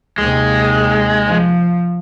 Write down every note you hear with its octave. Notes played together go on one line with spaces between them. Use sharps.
D#2 C3 G#3
F3